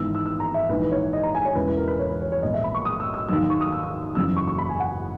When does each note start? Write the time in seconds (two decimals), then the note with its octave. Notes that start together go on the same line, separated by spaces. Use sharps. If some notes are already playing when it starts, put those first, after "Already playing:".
Already playing: G#1 G#2 E3 B3 E6
0.15 E6
0.26 E6
0.40 A#5
0.54 E5
0.69 A#1 G#2 E3 B4
0.82 B4
0.91 C#5
1.13 D#5
1.23 A#5
1.35 G#5
1.45 C#5
1.55 E1 E2 C#3 E3 B4
1.67 B4
1.77 A#4
1.88 B4
1.99 C#5
2.10 B4
2.21 C#5
2.32 C#5
2.42 A#1 A#2 G#3 B3 D#5
2.54 E5
2.64 B5
2.74 C#6
2.85 D#6
3.00 E6
3.14 E6
3.29 D#2 D#3 F#3 E6
3.50 C#6
3.61 D#6
3.72 E6
3.83 E6
4.15 F#1 E2 C#3 F#3 E6
4.36 C#6
4.48 C#6
4.58 B5
4.69 G#5
4.80 F#5